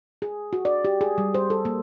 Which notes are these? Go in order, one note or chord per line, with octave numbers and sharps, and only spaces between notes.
G#4
F#4
D5
G4
G#4
G3
C5
A4
A#3